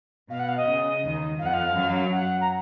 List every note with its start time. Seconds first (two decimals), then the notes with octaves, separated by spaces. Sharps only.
0.29 B2 F5
0.39 F#5
0.48 F5
0.57 D#5
0.67 C#3
1.02 D#2 D#3
1.39 F2 F3 F5
1.46 F#5
1.54 F5
1.74 F#2 F#3
2.11 F#5
2.41 A#5